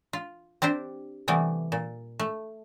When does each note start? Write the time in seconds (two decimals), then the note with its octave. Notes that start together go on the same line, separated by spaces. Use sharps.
0.13 F4
0.62 C4 D4 G4 C5
1.28 C3 E3 G3 A3 B3
1.72 A#2
2.19 A3